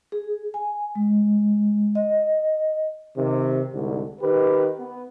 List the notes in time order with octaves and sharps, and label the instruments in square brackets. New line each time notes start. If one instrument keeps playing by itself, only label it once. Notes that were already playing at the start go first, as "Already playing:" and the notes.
[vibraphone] G#4
G#5
G#3
D#5
[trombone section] C3 D#3
C2 G#2 D3
D#3 G4 B4
B3